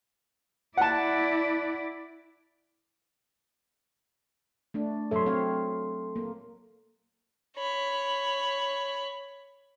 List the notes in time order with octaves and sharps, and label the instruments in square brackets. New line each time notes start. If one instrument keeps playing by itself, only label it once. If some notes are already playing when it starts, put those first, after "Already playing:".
[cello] E4 D5 [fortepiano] F#5 A5
[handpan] A3 D4
[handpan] F#3 C#5 E5 [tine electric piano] A4 C6
[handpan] C4 C#5 F5
A#3
[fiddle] C#5 B5